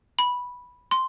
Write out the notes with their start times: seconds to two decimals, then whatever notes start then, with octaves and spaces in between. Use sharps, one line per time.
0.19 B5
0.91 C6